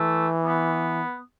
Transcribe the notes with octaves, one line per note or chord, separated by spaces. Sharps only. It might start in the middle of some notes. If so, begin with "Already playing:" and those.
Already playing: E3 A3
B3